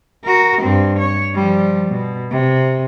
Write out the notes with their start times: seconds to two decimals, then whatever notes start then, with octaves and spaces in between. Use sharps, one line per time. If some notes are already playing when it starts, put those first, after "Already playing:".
0.24 F#4 A#4
0.61 G2 C4
0.99 C#5
1.34 F3 G3
1.90 B2
2.31 C3